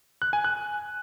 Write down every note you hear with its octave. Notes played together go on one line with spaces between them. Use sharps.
F#6
G#5
F#6